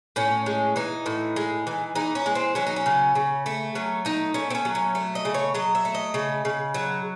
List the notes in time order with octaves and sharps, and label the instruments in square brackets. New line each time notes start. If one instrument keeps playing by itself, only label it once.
[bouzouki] A2 C#4
G#3
E3 D#4
A2
G#3
E3
E3 D#4
C#4
G#3
C4
F#3 C#4
D#4
C#4
C#3
C#3
A3
F#3 C#4
A3 D#4
A3 C#4
C4
C#4
F#3
C#4
A3
D#5
C#3
C#5
F#3 D#5
E5
A3
D#5
C#3
C#3
F#3